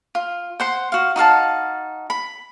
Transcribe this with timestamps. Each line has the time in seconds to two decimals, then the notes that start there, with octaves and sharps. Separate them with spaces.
0.15 F4
0.60 C5 F#5 C6
0.92 F#4 F5
1.16 D#4 F#4 F5 A5
2.10 B5